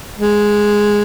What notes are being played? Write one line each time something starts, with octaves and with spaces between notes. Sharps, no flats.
G#3